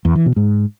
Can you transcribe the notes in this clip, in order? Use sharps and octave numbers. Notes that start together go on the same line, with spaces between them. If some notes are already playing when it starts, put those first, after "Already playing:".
E2
E3
B2
G#2